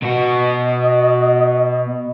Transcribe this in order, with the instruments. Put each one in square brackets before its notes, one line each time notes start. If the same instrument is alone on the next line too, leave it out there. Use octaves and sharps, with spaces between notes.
[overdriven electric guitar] B2 F#4 [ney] D#5